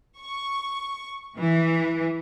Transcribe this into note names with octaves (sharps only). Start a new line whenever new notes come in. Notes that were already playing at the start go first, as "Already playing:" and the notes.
C#6
E3